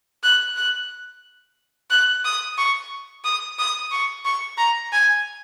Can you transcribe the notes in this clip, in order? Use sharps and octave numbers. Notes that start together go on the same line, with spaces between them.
F#6
F#6
F#6
D#6
C#6
D#6
D#6
C#6
C#6
A#5
G#5